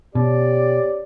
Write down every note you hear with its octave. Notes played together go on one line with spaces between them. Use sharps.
B2 C#4 G4 D5